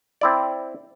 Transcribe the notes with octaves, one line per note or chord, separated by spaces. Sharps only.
C4 E4 D5